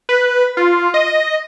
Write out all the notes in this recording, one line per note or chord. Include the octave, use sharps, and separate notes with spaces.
B4
F4
D#5